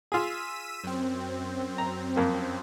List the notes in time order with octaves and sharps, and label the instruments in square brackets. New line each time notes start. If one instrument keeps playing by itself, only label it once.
[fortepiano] F4 G#4 [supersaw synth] E6 B6 D#7
[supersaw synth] F#2 C4
[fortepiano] A#5
F2 A#3